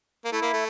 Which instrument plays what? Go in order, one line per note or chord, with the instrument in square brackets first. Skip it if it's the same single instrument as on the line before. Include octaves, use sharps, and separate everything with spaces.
[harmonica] A#3
[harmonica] A3 [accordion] E4
[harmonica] A#3
A3